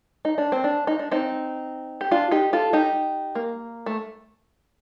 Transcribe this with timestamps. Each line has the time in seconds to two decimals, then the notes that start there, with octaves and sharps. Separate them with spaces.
0.25 D#4
0.38 D4
0.52 C4
0.64 D4
0.87 D#4
0.99 D4
1.11 C4 D#4
2.01 G4
2.11 D4 F4
2.31 D#4 G4
2.53 F4 A4
2.73 D#4 G4
3.35 A#3
3.86 A3